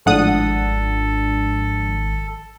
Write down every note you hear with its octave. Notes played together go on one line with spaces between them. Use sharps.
G#1 A2 F3 G#3 D4 A4 F#5 D#6